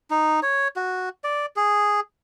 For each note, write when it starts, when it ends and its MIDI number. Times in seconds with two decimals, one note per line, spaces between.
0.11 0.40 63
0.43 0.68 73
0.76 1.09 66
1.24 1.46 74
1.56 2.00 68